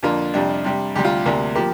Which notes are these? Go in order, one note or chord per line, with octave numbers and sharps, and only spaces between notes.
F2 D3 A#3 D4 F4
F2 C3 G3 D4
C3 G3 D4
D2 C3 G3 G4
F4
D2 C3 A#3 D4
F3 A#3 G4